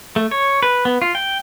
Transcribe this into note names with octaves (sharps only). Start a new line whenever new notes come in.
A3
C#5
B4
B3
F4
G5